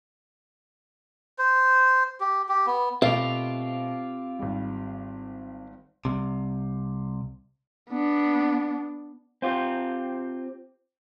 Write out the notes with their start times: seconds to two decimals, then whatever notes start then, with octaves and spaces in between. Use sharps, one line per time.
1.38 C5
2.20 G4
2.49 G4
2.66 B3
3.02 B2 A3 C4 F4 G4 F5
4.39 G#1 G3
6.05 C2 C3
7.90 B3 D4
9.42 C4 F4 G4